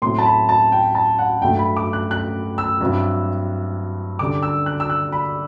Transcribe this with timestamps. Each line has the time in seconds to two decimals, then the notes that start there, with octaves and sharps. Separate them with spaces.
0.02 A2 F#3 C4 E4 C6
0.19 A5
0.25 B5
0.49 A5
0.72 G5
0.95 A5
1.19 F#5
1.42 G2 F#3 A3 G5
1.59 B5
1.77 D6
1.93 F#6
2.11 F#6
2.58 E6
2.81 G2 F#3 C4 E4
4.19 D3 G3 D4 D6
4.43 E6
4.66 F#6
4.80 E6
4.90 F#6
5.12 B5